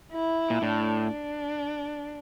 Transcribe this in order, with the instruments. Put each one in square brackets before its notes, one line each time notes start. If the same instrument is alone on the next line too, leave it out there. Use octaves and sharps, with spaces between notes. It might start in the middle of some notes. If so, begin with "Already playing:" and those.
[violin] E4
[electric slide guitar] A#2
[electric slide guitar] A2 [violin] D4
[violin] D4